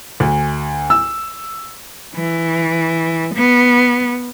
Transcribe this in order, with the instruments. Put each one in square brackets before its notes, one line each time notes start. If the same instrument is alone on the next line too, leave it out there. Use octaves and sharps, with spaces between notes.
[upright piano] D2
E6
[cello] E3
B3